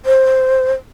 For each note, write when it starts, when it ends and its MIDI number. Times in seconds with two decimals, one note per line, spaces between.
0.05 0.71 72